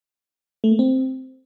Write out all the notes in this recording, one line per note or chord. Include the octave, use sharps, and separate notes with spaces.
A3
A#3
C4